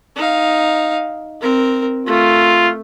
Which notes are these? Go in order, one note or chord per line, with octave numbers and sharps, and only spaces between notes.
D#4 F5
C4 A#4
A3 F4